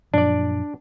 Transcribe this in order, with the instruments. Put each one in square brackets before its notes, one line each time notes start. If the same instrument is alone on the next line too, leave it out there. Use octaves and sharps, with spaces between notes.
[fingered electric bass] F#2 A#2 F3 [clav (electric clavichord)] D4 D5